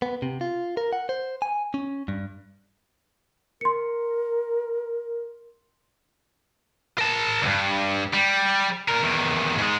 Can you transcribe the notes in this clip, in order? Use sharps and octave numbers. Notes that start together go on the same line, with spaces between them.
B3
C3
F4
A#4
F#5
C5
G#5
C#4
G2
A#4 C6 C#7
A#4 A5
D2 G2
G3
A#2 A#4
E2 D#3
G#2 G#3